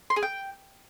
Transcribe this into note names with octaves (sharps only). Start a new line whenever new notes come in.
C6
G#4
G5